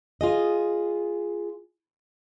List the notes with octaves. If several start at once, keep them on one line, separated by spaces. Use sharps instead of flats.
F4 G#4 D#5